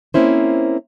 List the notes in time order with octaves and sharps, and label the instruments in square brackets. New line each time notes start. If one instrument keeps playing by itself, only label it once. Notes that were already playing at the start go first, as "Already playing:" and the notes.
[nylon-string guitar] A#3 C4 C#4 E4 C5